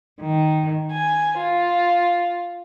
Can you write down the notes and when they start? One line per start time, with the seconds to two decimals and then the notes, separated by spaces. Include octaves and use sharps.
0.21 D#3
0.91 G#5
1.37 F4